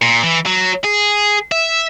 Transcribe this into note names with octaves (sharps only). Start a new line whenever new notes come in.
A#2
E3
F#3
G#4
E5